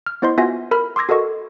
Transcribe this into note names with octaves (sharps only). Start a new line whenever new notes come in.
F6
B3 E4 C5 D#5 C6
B3 F4 F#4 E5 G#5 A#6
A#4 B5 F6
C6 D6 E6 G#6 A#6
F#4 A4 A#4 D#5 C#6